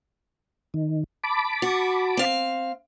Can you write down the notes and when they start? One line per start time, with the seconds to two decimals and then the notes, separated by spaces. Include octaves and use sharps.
0.74 D#3
1.24 A5 B5 D6
1.62 F#4
2.17 C4 F5